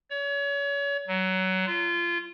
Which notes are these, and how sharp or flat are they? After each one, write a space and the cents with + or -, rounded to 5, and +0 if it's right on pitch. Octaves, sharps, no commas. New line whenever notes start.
C#5 +35
F#3 +20
F4 -25